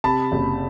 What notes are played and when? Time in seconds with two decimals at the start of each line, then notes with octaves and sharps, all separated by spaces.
0.04 C3 A5 B5
0.32 F#1